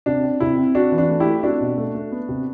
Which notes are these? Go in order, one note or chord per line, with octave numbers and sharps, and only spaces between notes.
C3 D4
C4
C3 E4
C4
C4 D4 F#4
E3
D4 F#4
A3
E4 G4
A3
C4 D4 F#4
B2
A3
A3
B3
C3